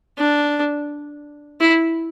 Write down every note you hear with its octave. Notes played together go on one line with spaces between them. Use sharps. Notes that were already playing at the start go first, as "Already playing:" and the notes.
D4
E4